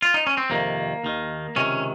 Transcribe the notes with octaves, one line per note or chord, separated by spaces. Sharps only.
F4
D#4
C#4
C4
F2 C3 D#3 A#3
D#2 D#3
C#2 C3 D#3 C#4